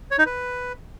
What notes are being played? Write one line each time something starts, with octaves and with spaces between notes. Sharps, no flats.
C#5
D#4
B4